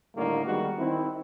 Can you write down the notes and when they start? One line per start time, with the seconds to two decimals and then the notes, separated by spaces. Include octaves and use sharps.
0.16 A2 D3 D#3 G3 A#3
0.46 D#3 G3 G#3 B3 F#4
0.79 D#3 C4 E4